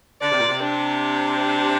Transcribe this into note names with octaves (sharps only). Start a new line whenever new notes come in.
D3 D5
C3
A#2
C3
D4